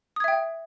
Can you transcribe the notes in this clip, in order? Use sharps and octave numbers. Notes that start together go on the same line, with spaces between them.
E5 G5 D#6 G#6